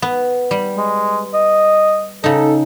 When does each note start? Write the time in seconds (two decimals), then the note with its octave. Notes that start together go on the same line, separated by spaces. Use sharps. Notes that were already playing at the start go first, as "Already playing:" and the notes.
0.02 B3
0.51 G3
0.77 G#3
1.34 D#5
2.24 C#3 D#4 A4